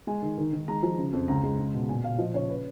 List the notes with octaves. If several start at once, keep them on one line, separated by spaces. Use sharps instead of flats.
G#3 G#5
D#3
D#3
D#3
G#3 A#5
F3
C#3
F2
C#2 A#5
G#3
C#2
B2
A#2 G#5
A#2 F5
F3 D#5
C#3 C#5
B4